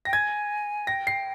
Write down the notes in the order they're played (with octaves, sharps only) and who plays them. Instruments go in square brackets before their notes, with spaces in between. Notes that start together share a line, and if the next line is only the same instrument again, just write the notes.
[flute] G5 [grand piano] A#6
[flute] G#5 [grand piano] G#6
[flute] G5 [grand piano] A#6
[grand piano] C7